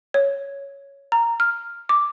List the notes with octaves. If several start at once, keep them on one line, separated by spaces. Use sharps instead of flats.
C#5
A#5
F6
D6